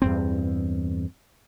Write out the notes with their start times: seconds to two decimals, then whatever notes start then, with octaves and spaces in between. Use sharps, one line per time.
0.02 E2 G2 C4